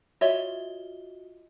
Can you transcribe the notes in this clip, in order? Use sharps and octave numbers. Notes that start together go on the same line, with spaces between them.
F4 F#4 C#5 D#5 E5 G7